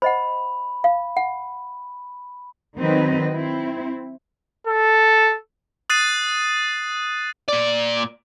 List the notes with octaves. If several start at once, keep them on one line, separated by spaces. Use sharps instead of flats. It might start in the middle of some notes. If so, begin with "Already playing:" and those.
C5 D#5 F#5 B5
F5
F#5
D#3 F#3 C4 B4 D#5
C4 E4
A4
D#6 F#6 A6 C7 D#7
A#2 D5